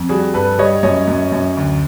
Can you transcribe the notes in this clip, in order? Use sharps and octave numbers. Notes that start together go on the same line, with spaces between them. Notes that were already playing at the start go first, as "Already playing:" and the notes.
Already playing: F2
G3 F#4 G#4
G2 A4 B4
G3 C#5 D#5
F#2 C#5 D#5
F#2
F#2
D2